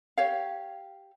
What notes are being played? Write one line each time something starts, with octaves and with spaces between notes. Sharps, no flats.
G4 C#5 F5